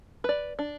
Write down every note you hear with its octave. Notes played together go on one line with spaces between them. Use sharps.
B4 D5
D4